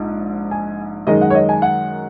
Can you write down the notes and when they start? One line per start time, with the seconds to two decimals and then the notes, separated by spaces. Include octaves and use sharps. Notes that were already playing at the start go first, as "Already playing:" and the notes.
Already playing: A#1 G#2
0.51 G#5
1.07 F#2 D#3 G#3 D#5
1.21 F#5
1.30 C#5
1.35 D#5
1.49 G#5
1.62 F#5